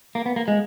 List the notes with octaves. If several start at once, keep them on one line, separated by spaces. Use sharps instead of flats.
A#3
B3
A#3
G#3